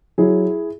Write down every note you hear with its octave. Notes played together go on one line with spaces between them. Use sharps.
F#3 E4 G#4